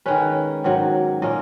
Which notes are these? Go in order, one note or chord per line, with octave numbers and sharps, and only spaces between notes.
D#3 G#3 C#4 B4
G#2 D#3 F#3
A#2 A#3 C#4 D#5